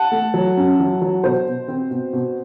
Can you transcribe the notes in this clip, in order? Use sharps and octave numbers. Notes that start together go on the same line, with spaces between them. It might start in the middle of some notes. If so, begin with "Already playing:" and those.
Already playing: F#5 A5
A3
F#3
F#2
F#3
F#3
B2 C5
B2
C4
B2
B2